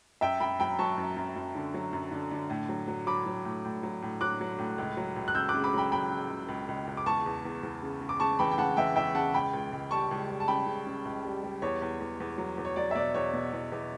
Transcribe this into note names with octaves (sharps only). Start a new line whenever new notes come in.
F#2 E5 G5
F#2 G5 B5
F#3 G5 B5
F#3 A5 C#6
F#2
F#2
F#2
D3
F#3
F#2
D3
D3
A2
F#3
F#3
F#3 B5 D6
F#3
A2
A2
F#3
A2
F#3 D6 F#6
F#3
A2
C#2
F#3
C#2
F#6
C#3 E6 G6
D6 F#6
C#3
B5 D6
F#3 G5 B5
F#3 G5 B5
C#3
C#2
C#2
C#2
C#2
D6
E2 A5 C#6
E2
E2
E2
C#3
C#3
D6
C#3 A5 C#6
E3 G5 B5
G5
C#3 F#5 A5
E3 E5 G5
E2 E5 G5
C#3 F#5 A5
C#2 G5 B5
C#2
C#2
G3 A5 C#6
C#2
G3
A5
C#3 G5 B5
C#3
C#3
C#2
G3
G3
E2 C#5
E2
E2
E2
F#3
E2
C#5
F#3 D5
E5
B2 D5
E2 C#5
B2
E2
E2